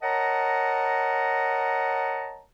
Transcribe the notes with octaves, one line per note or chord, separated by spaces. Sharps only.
A#4 C#5 D#5 F#5 A5 A#5